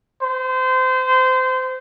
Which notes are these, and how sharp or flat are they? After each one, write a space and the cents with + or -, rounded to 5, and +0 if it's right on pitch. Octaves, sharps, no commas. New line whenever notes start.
C5 -25